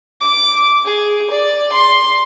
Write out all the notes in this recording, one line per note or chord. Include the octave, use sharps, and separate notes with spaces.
D6
G#4
D5
C6